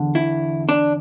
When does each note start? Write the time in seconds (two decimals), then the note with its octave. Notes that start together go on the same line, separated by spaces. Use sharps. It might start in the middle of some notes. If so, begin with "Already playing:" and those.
Already playing: E2 D3
0.15 E4
0.69 D4